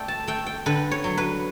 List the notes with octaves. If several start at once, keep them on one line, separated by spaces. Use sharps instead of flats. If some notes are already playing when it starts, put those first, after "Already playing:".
Already playing: A3 D5 G5
A5
A3 G5
G5
D3 B4
C#5
F#3
B4